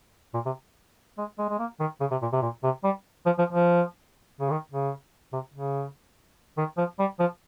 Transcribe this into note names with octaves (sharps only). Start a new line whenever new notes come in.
A#2
C3
G#3
G#3
G#3
A#3
D#3
C#3
C3
A#2
C3
A#2
C3
G3
F3
F3
F3
C#3
D#3
C#3
C3
C#3
D#3
F3
G3
F3